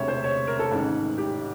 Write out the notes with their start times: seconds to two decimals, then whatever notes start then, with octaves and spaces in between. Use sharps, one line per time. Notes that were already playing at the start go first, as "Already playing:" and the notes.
Already playing: E1 D2 C3 C#5 E5
0.08 C5
0.24 C#5
0.47 A#4
0.59 A4
0.71 A1 G#2 D#3
1.18 G4